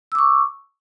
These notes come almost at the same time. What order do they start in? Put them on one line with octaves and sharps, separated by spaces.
E6 D6 C#6